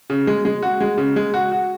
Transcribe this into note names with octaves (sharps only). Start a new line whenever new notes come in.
C#3
G#3
G#3
F#4
G#3
C#3
G#3
F#4
F#4